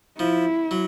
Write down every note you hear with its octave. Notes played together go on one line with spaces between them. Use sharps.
F3 E4
F#3